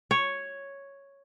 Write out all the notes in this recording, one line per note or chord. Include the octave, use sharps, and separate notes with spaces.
C#5